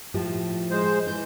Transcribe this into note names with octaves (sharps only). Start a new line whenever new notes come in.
A2 F3 G4
G#3 C5
E3 G6